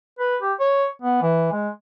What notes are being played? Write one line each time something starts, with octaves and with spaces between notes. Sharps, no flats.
B4
G4
C#5
B3
E3
G#3